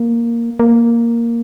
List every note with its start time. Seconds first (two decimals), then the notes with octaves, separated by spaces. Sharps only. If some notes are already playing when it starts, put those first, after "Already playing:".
Already playing: A#3
0.59 A#3